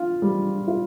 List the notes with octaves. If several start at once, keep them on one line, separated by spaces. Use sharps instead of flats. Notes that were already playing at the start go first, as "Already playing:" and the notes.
Already playing: F4
G3
F4